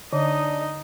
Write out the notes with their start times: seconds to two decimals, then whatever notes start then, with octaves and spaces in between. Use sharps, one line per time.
0.13 D3 D4 D#4 D#5